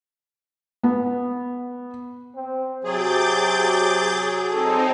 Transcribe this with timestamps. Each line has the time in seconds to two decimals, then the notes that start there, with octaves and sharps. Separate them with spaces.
0.83 B3
2.36 C4
2.84 C3 F#3 G#4 D6 G6 A6
4.51 C4 D#4 A4